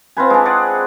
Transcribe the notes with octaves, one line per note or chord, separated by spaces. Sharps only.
C4 F4 B4 G#5
G#3 D4
G#4 D5 F#5